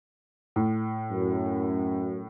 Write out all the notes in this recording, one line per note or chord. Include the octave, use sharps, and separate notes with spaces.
A2
F#2